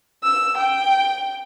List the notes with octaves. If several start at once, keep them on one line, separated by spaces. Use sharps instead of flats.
E6
G5